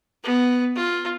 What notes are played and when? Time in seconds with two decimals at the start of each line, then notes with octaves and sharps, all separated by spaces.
0.24 B3
0.75 F4